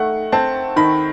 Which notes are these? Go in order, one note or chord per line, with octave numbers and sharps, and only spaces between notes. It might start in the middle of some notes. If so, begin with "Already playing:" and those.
Already playing: D#3 A3 F#5
C4 A5
D#3 B5